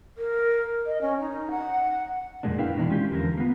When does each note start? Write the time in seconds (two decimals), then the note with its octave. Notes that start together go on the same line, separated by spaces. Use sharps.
0.18 A#4
0.86 D#5
1.01 C#4
1.20 D#4
1.51 F#5
2.43 F2 A#2 D3 G#3 A#3 D4
2.58 D4 E4 A#4 B4 F5 G5
2.76 B2 D#3 E3 D4 E4
2.90 G#3 C#4 F4 G4
3.11 E2 D3 F3 A#4
3.38 A#3 B3